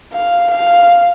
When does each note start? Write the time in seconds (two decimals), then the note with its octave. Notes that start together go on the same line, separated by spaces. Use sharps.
0.13 F5
0.51 F5